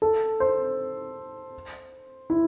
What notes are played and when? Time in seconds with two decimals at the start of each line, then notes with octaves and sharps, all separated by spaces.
0.02 A4
0.40 C5
2.30 E4